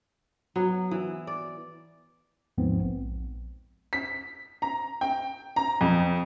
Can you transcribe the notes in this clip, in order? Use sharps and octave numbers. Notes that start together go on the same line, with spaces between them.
F#3 B3
E3
D5
D#2 G#2 F3 B3 C4
A#1
B6
A#5
G5
A#5
F2